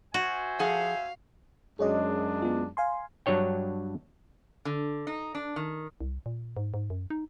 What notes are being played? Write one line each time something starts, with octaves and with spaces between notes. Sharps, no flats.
F#4 C5 E5 G#5
F3 G#4 F5 F#5
F#2 G#3 D4 G#4 C#5 D#5
B3 F4
F5 G#5 C6
G2 F#3 D4 C#5 G5
D3
D#4
D4
D#3
C2
A#2
G#2
G#2
F#2
D#4